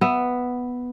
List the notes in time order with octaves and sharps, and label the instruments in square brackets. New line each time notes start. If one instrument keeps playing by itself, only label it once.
[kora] B3 E5